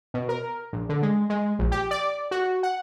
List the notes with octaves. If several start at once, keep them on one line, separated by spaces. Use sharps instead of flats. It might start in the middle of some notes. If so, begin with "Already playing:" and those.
B2
A#4
A#1
D3
G#3
G#3
A#1
G4
D5
F#4
F#5